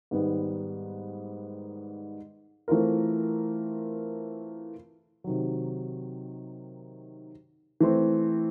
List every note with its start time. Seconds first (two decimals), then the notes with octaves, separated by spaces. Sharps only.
0.11 G#2 D#3 G3 B3
2.68 E3 A3 C4 F4 A#4
5.24 C3 D#3 F#3
7.80 E3 A3 C4